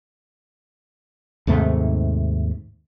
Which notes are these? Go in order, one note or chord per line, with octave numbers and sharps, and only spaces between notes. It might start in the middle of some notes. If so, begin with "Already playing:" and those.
D#2 G#2 C3 A3